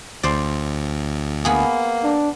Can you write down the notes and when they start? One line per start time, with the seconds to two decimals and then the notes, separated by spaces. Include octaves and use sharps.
0.23 D2 C5 D5
1.45 A#3 B3 G#4
2.04 D4